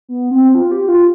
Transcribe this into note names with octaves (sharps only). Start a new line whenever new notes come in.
B3
C4
F4
G4
F4